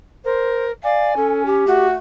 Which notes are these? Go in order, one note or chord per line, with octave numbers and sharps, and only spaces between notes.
A#4 C5
D5 F5 G#5
C#4 A4
G4
A3 F#4